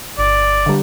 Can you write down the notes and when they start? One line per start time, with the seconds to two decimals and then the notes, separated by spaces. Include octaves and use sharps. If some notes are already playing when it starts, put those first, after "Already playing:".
0.19 G1 D5
0.66 D3 G3